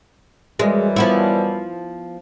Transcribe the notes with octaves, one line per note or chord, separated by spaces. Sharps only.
F#2 E3 G3 G#3
F3 B3 E4